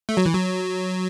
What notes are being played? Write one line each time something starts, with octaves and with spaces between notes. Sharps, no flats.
A3
F#3
E3
F#3